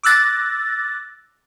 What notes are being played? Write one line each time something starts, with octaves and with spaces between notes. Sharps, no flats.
D6 E6 F#6 A6 A#6